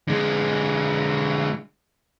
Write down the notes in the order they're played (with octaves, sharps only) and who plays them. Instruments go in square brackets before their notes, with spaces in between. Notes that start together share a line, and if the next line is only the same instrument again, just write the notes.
[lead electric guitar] D3 G#3